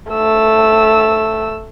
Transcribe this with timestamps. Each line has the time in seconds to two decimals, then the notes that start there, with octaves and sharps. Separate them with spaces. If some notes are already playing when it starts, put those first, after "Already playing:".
0.10 A3 E6